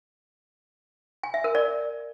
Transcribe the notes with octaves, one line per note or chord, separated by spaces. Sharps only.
G#5
E5
A#4
D5